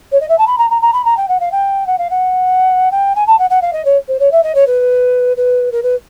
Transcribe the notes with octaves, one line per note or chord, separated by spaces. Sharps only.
C#5
D#5
E5
A5
B5
A#5
A#5
A#5
B5
A#5
G5
F#5
F5
G5
F#5
F5
F#5
G5
G#5
A5
F#5
F#5
F5
D#5
C#5
C5
C#5
E5
D#5
C#5
B4
B4
A#4
B4